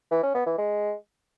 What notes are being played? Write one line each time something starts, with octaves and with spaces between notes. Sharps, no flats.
E3
C#4
B3
E3
G#3